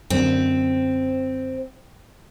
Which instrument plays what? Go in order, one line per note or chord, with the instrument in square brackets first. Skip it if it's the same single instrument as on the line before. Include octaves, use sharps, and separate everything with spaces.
[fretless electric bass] F#2 D3 [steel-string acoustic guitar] C4